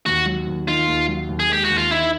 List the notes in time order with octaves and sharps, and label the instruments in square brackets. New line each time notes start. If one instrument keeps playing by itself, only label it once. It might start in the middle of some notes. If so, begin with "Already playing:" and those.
[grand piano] D#2 [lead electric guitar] F#4
[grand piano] F#3
D#2
[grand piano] D#3 [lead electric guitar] F4
[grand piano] D#2
F#3
D#2
[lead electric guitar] G#4
[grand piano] G#3 [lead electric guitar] G4
[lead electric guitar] F#4
[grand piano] D#2
[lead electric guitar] F4
[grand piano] D#3 [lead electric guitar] E4